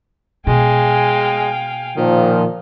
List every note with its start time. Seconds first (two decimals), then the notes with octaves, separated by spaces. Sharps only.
0.47 B2 G#3 F5 G5 G#5
1.96 A#2 D#3 F3